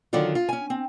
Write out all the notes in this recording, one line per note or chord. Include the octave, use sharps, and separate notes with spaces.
D3 D#3 F#3 D4 F4
F4
C#4 G#5
C4